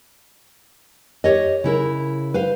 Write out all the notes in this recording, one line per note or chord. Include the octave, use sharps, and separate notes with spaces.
G4 A4 C#5 D#5
C#3 E4 A#4
B4 C5 F5